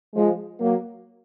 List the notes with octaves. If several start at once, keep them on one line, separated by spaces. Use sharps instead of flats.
F3 G#3
F#3 A#3